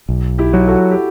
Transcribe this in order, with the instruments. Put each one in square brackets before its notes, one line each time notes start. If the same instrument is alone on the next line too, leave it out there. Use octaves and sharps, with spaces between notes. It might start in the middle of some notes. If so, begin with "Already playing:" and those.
[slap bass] B1
[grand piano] E4 G4
[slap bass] F#3
[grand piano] F#4 A4
G4